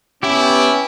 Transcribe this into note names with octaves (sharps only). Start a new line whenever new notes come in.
B3 C#4 E4 G4 D6